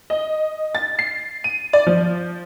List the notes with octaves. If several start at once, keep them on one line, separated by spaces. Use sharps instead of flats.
D#5
A6
C7
D#7
D5
F3